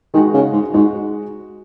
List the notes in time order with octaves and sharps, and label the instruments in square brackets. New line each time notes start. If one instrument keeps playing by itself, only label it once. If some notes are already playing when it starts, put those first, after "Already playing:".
[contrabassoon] D#3 [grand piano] G#3 D#4 F#4
[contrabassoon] C#3
G#2
[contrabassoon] G#2 [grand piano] G#3 D#4 F#4